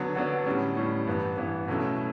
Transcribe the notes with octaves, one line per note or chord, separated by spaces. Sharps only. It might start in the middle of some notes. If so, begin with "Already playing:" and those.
Already playing: D3 F#3 B3 D4
D3 F#3 B3 D4
A2 G3 C#4
A2 G3 C#4
G2 E3 B3
G2 E3 B3
B2 F#3 A3 C#4 E4